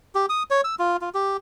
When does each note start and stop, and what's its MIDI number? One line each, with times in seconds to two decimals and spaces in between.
0.15 0.26 67
0.29 0.43 87
0.50 0.61 73
0.64 0.75 88
0.79 0.97 65
1.01 1.09 65
1.14 1.37 67